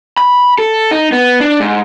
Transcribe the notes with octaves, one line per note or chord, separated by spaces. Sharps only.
B5
A4
D#4
B3
D4
G#2